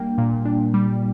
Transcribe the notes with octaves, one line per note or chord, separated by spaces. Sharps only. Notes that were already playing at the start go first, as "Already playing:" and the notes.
Already playing: G3 A#3 D4 G5
A#2
D4
G3